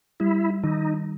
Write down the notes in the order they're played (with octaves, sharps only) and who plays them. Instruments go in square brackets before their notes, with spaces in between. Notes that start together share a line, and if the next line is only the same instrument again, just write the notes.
[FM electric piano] G3 [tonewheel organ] E4
[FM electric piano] D#3 [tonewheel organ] D#4